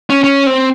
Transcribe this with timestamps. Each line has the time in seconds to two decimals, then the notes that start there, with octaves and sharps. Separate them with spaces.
0.10 C#4
0.24 C#4
0.46 C4